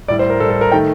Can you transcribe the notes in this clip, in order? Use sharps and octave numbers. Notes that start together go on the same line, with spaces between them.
A2 G3 D5
C5
A#4
A2 G3 A4
A4
A#4
D#3 A3 G5